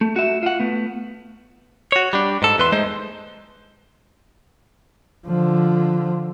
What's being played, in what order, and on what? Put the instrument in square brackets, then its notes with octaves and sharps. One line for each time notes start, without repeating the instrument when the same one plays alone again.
[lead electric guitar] A3
F#4 E5
F4 F#5
A3 B3
[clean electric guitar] F#4 C#5
G3 D4
G#2 A4
E2 B4 C6
G#3 A3 D#4 C5
[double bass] D3 F3